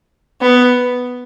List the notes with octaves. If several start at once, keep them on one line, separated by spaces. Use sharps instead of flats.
B3